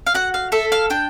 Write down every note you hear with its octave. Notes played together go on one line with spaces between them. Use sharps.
F5
F#4 F#5
F5
A4 E5
F5
D4 G5